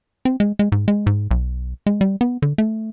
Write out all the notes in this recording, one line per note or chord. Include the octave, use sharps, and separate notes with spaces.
C4
G#3
G#3
G#2
G#3
G#2
B1
G#3
G3
B3
D3
A3